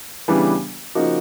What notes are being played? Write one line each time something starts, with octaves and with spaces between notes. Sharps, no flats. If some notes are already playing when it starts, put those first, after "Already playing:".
C#3 E3 G3 B3 D4
C#3 F3 A#3 D#4 F#4